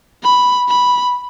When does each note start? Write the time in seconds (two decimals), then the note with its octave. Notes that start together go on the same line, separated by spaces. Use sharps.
0.23 B5
0.69 B5